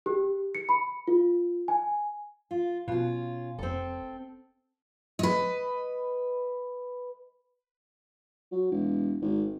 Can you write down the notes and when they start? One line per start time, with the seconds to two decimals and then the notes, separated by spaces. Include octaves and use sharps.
0.06 G4
0.55 C#7
0.69 B5
1.08 F4
1.68 G#5
2.51 F4
2.88 B2 C#4 F4
3.59 F1 C4 A4
5.19 B4 D#5
8.52 F#3
8.71 E1
9.21 G#1